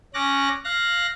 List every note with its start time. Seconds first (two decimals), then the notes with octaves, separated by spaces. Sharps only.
0.14 C#4 D6 F#6 A#6
0.65 F5 F#6 A#6